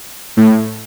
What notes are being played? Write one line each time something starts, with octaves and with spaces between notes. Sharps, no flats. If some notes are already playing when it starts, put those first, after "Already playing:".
A2